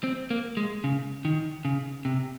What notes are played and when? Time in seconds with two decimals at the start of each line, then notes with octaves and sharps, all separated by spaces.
0.04 C4
0.30 A#3
0.57 G#3
0.84 C#3
1.25 D#3
1.65 C#3
2.05 C3